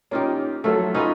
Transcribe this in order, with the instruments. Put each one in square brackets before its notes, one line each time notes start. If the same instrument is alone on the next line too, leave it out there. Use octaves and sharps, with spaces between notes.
[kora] A#3 F4 G4 [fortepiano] C#4 D#4
[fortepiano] F#3 A4 E5 [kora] A3 F4
[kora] C#4 B4 [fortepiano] D#4 F4